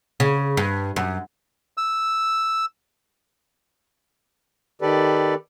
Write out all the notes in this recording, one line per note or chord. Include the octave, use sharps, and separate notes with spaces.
C#3
G2
F#2
E6
D#3 G4 A4 B4 D5